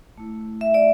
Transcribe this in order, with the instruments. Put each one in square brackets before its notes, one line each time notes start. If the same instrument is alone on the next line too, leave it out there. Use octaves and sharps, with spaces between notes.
[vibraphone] A3 E4
E5
D5